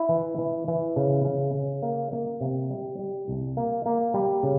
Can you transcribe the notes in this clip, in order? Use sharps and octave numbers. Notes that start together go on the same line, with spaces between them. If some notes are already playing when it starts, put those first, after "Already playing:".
Already playing: E4
E3
E3
E3
C#3
C#3
C#3
A#3
A#3
C3
G3
G3
C2
A#3
A#3
G3
C#3